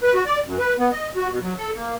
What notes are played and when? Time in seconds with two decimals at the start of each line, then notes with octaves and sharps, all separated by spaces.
0.01 B4
0.14 F#4
0.26 D5
0.46 F#2
0.59 B4
0.78 B3
0.92 D#5
1.16 F#4
1.29 B2
1.42 F#3
1.58 A4
1.74 A#3